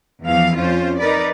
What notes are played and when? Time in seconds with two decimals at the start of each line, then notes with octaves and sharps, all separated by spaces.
0.24 E2 E3 F3 F5
0.55 F2 C#4 F4 C5
0.99 D#4 A#4 B4 D5